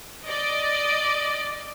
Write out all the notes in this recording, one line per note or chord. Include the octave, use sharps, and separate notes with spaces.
D5 D#5